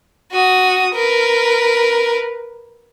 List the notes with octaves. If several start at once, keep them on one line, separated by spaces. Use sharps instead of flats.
F#4 D#6
A#4 B4